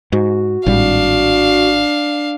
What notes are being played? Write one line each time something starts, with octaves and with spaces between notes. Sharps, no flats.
G#2 F#4
G#1 A2 G3 D4 F5